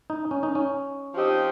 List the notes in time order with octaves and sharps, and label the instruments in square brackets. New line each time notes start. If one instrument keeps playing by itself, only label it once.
[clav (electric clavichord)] D#4
C#4
D#4
C#4
[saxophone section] F3 C4 D#4 G4